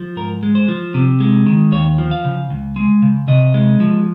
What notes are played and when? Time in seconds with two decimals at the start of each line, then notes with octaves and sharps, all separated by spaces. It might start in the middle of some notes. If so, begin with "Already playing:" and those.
Already playing: F3
0.16 G#2 A#4
0.43 G#3
0.55 C5
0.68 F3
0.94 C3
1.20 G#3
1.46 D#3
1.72 D#2 C#5
1.98 F3
2.11 F5
2.24 C#3
2.50 C#2
2.76 G#3
3.02 C#3
3.28 C3 D#5
3.54 G#3
3.80 F3